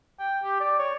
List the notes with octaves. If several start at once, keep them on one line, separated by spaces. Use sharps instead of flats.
G5
G4
D5
C#5